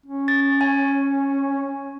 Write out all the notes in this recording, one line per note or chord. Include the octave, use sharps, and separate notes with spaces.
C#4
A6
G#5